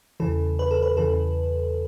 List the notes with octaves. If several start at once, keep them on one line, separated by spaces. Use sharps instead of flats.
E2 C#3 E3 A4
B4
A4
B4
E2 C#3 E3 A4